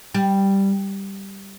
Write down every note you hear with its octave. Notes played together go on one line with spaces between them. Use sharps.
G3